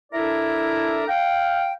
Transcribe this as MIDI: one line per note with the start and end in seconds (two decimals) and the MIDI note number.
0.12 1.04 62
0.12 1.04 64
0.12 1.04 69
0.12 1.04 70
0.12 1.04 74
0.12 1.04 76
1.08 1.73 77
1.08 1.73 79